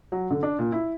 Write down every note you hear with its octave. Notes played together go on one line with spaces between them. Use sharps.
F#3
D3
D4
A#2
E4